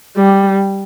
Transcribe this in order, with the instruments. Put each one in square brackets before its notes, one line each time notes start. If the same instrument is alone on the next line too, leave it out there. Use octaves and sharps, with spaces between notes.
[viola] G3